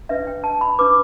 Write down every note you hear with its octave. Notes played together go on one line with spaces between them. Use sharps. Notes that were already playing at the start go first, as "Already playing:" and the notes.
D4 B4 E5
G5
A5
B5
D4 B4 D6